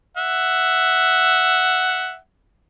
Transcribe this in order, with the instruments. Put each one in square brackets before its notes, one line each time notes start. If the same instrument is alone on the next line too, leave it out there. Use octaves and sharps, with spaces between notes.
[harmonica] E5 F#5